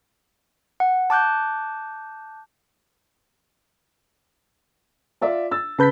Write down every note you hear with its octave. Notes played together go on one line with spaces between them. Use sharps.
F#5
A5 D6 F#6 G6
F4 D5 E5
E6 A6
C#3 B4 A5 B5 G6 B6